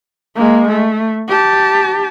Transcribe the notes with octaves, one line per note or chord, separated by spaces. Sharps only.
G#3 A#3
A3
G4 A5